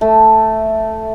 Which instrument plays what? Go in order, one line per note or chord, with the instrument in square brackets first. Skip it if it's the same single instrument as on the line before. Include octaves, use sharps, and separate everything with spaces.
[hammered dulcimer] A3 E5 A5